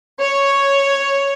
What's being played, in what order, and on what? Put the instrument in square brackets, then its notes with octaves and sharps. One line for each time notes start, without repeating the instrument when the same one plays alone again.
[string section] C#5